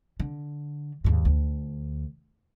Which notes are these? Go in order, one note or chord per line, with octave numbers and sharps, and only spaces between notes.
D3
D#2 G#2
D2